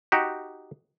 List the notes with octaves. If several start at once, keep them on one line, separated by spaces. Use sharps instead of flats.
D#4 F#4 G4